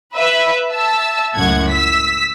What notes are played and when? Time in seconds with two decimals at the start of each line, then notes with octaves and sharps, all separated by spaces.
0.16 B4 E5
0.72 E5 A5 E6
1.36 C#2 F#2 A2 F#5 G#6
1.70 E6 B6